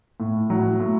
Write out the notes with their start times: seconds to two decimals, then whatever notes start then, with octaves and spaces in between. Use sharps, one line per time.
0.20 A2
0.50 F#3
0.80 A2